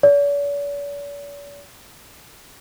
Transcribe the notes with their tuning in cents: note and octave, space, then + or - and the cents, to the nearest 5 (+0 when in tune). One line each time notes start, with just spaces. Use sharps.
D5 -45